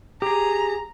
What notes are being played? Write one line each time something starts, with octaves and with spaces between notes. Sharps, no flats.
G4 G#4 A#5